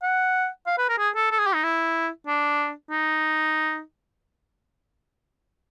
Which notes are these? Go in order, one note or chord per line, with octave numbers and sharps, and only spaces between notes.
F#5
F5
B4
A#4
G#4
A4
A4
G#4
G4
D#4
E4
D4
D#4